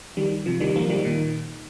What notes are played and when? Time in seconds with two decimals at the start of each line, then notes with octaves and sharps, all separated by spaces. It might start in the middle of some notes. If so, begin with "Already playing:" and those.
0.17 D#3 G3
0.46 C3 F3
0.60 D#3 G3
0.75 F3 A#3
0.89 D#3 G3
1.04 A#2 D#3